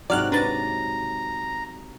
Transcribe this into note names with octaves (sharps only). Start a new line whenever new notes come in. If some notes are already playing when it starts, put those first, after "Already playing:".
G#2 C3 F#3 D5 F6 F#6
D4 B4 A#5 A6